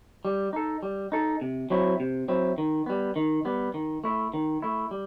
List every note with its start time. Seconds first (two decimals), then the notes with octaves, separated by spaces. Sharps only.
0.25 G3
0.53 D#4 A4
0.83 G3
1.12 D#4 A4
1.41 C3
1.70 F#3 C4 E4
2.00 C3
2.28 F#3 C4 E4
2.58 D#3
2.86 G3 B3
3.16 D#3
3.45 G3 B3
3.74 D#3
4.04 A3 E4
4.34 D#3
4.62 A3 E4
4.91 G3